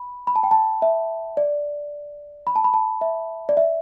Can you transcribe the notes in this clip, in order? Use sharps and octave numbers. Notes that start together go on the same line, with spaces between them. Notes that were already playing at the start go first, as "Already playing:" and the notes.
Already playing: B5
B5
A5
G5
A5
E5
D5
B5
A5
B5
A5
E5
D5
E5